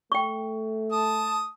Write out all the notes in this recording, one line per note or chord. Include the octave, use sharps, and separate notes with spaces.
A3 G5 C#6
A5 D#6